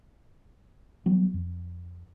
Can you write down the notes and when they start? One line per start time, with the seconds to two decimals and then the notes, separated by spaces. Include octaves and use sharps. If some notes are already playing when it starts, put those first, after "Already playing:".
1.06 E3 F#3 G3 B3
1.34 F2